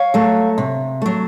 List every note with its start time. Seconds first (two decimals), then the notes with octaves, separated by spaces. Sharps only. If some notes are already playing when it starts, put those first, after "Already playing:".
Already playing: C#5 F5
0.14 F#3 A3
0.58 C3
1.02 F#3 A3